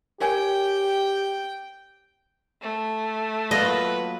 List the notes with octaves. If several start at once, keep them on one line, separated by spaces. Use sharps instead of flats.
G4 A#4 C#5 G5 G#5
A3
F#3 A#3 F4 B4 D#5